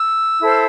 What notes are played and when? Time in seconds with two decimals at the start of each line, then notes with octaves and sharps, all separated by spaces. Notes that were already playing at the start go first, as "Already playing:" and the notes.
Already playing: E6
0.40 E4 A4 C5